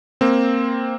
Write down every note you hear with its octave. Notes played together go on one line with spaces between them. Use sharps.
A#3 C4